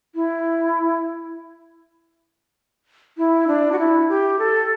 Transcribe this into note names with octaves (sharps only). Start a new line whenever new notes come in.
E4
E4
D4
F#4
E4
G4
A4